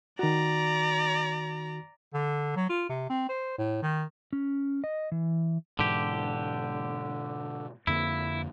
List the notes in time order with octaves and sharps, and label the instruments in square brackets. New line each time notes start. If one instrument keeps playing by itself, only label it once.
[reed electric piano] D#3 F#4 [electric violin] D5 A#5
[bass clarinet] D3
F#3
F4
C3
C4
C5
A2
D#3
[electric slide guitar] C#4
D#5
E3
[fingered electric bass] G#2 B2 E3 [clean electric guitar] D3 G4
[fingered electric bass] F2 D3 A#3 [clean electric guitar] E4